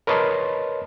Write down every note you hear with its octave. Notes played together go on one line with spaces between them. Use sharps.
A#4 B4 C#5 D#5 A5 C6